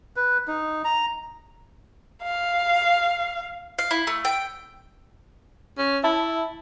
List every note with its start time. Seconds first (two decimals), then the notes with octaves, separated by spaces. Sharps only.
0.16 B4
0.48 D#4
0.84 A#5
2.23 F5
3.79 F5
3.91 E4
4.07 A3
4.25 G5
5.78 C#4
6.04 E4 E5 A5 B5